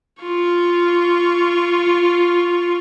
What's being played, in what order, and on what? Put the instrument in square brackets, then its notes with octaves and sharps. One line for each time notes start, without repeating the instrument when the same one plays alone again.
[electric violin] F4 C#6